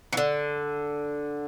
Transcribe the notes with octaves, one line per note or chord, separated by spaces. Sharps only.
E3
D3